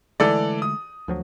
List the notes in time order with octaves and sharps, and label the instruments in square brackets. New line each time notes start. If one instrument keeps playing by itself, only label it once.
[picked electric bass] D3 G#3 A3 [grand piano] E3 A4 D5
[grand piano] D#6
[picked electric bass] D2 F3 F#3